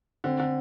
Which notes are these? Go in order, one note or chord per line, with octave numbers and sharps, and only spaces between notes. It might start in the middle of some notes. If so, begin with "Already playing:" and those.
D3 C4
D3